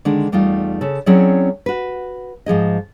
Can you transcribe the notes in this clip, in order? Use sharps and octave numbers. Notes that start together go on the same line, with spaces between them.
D3 D#3 G#3 D4
E2 G3 A3 D#4 F4
C#3 A4
F#3 C4 C#4 E4 G#4 D5
F#4 B4
G#2 F3 G#4 D#5